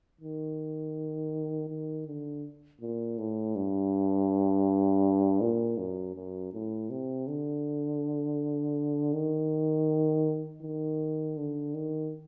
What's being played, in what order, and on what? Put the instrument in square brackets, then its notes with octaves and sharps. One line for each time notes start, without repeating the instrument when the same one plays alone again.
[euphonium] D#3
D#3
D3
A#2
A2
G2
A#2
F#2
F#2
A2
C3
D3
D#3
D#3
D3
D#3